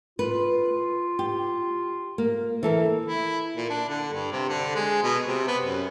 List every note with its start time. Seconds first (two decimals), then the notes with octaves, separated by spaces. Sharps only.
0.19 F4 B4
1.19 G4
2.18 A#3
2.63 E3 A4 A#4 E5
3.05 E4
3.57 A#2
3.70 D4
3.89 D3
4.13 G2
4.32 C3
4.49 D3
4.76 G#3
5.03 B2
5.28 C3
5.48 B3
5.63 F#2